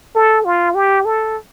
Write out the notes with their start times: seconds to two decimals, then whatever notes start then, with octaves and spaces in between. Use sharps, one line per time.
0.15 A4
0.45 F4
0.75 G4
1.05 A4